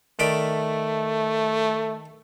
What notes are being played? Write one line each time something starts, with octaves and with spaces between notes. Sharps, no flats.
D#3 A3 D5 B5